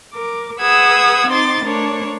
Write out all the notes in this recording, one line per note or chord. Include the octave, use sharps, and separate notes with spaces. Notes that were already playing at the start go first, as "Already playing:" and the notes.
A#4 D6
G#4 B4 F#5 D#6 E6 G#6
C4 D#4 C5 C6 D6 A6
A3 D4 A#4 C5 C#5